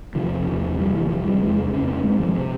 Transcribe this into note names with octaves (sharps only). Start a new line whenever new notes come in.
E2 C3 F3
E2 C3
F2 C3 G3
E3
F2 C3 F3
G3
E2 C3 G#3
F2 C#3 C#4
C4
G2 G#3
F3
C3 C4